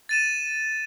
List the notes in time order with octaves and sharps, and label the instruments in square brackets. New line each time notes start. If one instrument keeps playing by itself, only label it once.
[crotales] A6 D#7 E7